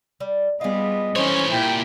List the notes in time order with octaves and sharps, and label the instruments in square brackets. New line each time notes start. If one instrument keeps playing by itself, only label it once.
[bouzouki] G3
[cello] G3 B3 [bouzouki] F4 G#4 [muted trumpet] D#5
[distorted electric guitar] E3 C#5 [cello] C#4 [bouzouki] D#4 A4 C5
[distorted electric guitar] A#2 [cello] E4 G4 [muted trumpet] G5